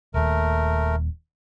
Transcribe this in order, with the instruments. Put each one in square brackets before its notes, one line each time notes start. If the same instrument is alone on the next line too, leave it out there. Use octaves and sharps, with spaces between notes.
[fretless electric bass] D#1 D#2 [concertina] A3 A#4